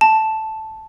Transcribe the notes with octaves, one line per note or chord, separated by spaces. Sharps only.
A5